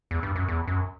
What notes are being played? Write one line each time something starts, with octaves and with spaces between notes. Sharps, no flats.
E2
G2
F#2
E2
F#2